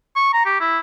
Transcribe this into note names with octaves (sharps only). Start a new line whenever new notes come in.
C#6
A#5
G4
E4